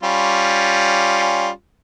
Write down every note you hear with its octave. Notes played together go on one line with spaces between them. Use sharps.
G3 C#4 F4